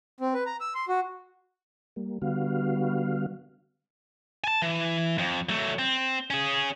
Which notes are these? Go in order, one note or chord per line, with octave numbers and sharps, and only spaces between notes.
C4
B4
A#5
E6
C6
F#4
G3 A#3
D3 G3 B3 F#4 F5
G#5 A5
E3
F2
F#3 A3
C4
C#4 G#4